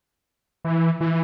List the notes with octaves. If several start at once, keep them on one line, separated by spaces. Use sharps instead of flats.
E3
E3